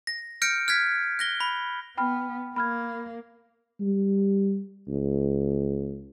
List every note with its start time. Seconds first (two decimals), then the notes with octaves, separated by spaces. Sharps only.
0.07 A#6
0.42 F6 G6 A#6 C#7 D7
0.68 F6 F#6 G#6 B6
1.19 F#6 A#6 G7
1.40 B5
1.97 B3 G5 B5 F6
2.56 A#3 B5 F6 G#6
3.81 G3
4.88 C#2